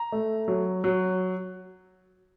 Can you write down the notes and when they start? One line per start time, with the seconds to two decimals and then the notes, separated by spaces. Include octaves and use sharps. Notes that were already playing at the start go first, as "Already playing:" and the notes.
Already playing: A#5
0.12 A3
0.48 F#3
0.84 F#3